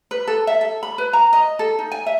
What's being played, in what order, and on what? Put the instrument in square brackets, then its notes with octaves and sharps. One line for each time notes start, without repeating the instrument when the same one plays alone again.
[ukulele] B4
A4
E5
A4
B5
B4
A#5
D#5
A4
D#4
G#5
E5